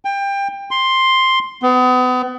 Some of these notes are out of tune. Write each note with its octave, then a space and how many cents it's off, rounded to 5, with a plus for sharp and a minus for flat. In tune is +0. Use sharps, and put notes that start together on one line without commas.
G5 +25
C6 +5
B3 +35